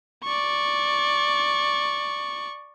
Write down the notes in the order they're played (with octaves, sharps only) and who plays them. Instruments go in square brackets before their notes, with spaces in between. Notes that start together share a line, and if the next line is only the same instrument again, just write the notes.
[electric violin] D5 C#6